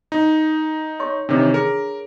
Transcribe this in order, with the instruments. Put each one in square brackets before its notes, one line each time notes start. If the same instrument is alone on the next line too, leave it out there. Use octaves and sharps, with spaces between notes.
[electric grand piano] D#4
[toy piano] C#5 C6 C#6
[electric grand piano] C3 D#3 E3 [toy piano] D4 C#5
[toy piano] G#4 [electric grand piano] A#4